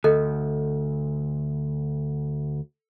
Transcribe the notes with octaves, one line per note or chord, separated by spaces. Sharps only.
D2 A4 D#5